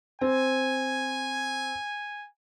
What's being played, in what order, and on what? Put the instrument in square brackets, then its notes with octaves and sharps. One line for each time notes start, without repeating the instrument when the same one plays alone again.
[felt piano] C4 [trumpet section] G#5